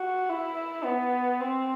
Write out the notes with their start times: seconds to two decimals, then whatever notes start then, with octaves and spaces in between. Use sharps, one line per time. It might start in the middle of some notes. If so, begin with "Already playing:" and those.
Already playing: F#4
0.30 E4
0.84 B3
1.40 C4